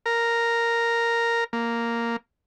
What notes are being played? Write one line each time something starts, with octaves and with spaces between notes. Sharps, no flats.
A#4
A#3